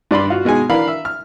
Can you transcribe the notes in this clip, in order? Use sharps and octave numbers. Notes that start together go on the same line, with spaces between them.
G2 D5 B5 C6
F4 F#4
B2 G#3 D#4 G#5
E3 D4 A#4 F5 B5
E5
F6